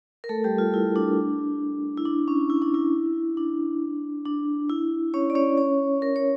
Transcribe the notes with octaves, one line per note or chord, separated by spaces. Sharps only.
A#4
A3 A4
G3 G4
F4
E4
D4
E4
D4
C#4
E4
D4
E4
D4
D4
E4
C#4 C#5
D5
C#4 C#5
C#4 C#5
A#4
C#5